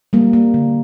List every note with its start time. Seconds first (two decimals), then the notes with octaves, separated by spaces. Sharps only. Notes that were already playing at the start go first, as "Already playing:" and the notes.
0.13 G3 A#3
0.33 A#3
0.54 D3